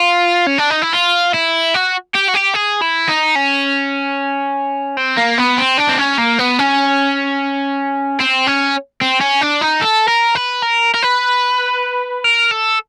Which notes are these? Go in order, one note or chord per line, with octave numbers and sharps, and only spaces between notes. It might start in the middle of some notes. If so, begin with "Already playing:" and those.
Already playing: F4
C#4
D4
D#4
E4
F4
E4
F#4
G4
F#4
G4
G#4
E4
D#4
C#4
C4
A#3
B3
C4
D4
C4
C#4
A#3
B3
C#4
C4
C#4
C4
C#4
D4
D#4
A4
A#4
B4
A#4
A#4
B4
A#4
A4